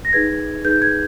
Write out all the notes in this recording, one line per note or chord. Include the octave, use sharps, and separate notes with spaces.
A#6
D#4 G#4 B4 G#6
D#4 G#4 B4 G6
G#6